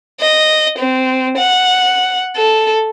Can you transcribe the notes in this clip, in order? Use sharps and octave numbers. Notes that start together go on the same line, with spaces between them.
D#5
C4
F#5
A4